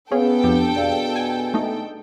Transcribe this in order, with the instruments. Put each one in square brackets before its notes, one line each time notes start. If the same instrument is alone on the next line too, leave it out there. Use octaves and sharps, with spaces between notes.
[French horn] B3 [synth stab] C#4 G#4 [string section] A4 G5 [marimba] F5
[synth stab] F2 [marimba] D4 G4
[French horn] B2 [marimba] G#4 D5 F5
[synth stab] G#5
A3 D#4